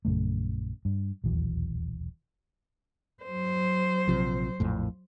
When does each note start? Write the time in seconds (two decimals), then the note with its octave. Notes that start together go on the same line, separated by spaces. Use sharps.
0.05 A#1 F#2 C#3 A3
0.85 G2
1.24 D#1 B1 E2 B2
3.23 F#3 C5
4.08 A#1 C3 F3
4.60 A#1 F2 A2